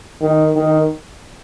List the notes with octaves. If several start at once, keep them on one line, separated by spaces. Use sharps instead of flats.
D#3
D#3